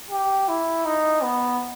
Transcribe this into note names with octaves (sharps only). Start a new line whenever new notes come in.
G4
E4
D#4
B3